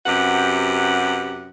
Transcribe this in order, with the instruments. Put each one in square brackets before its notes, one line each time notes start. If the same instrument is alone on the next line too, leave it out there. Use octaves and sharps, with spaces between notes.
[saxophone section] F#2 C3 G4 B4 F#5